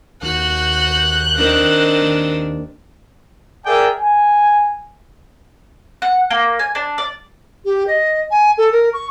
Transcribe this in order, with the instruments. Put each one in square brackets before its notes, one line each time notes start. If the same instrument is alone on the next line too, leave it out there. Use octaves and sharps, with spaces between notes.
[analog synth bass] D#2 [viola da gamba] F#4 [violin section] F#6 G6
[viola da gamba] D#3 C4 D4
[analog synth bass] D#2
[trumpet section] G#4 A#4 D5 E5 G5 G#5
G#5
[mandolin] F#5
A#3
G#5
D4
D5
[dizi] G4
D#5
G#5
A4
A#4
C#6